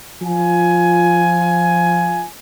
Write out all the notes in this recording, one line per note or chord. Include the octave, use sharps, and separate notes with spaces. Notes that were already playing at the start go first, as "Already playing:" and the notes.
F3 F4 G#5